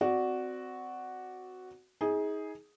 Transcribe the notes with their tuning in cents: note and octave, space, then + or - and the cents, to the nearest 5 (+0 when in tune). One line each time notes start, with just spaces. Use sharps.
C4 -20 F#4 +0 D5 +0
D#4 +35 G#4 +0